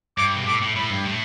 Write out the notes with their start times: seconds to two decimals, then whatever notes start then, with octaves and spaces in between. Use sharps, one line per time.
0.18 G2 D6
0.36 B2
0.46 A2 D6
0.61 A2
0.76 A2 B5
0.91 G2
1.06 A2